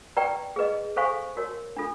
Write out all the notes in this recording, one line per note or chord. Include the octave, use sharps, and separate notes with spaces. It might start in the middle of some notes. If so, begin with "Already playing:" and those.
G4 B4 D5 G5 A#5
G#4 B4 D#5
A4 C5 F5 G#5 C#6
F#4 A#4 C#5
D4 F4 A4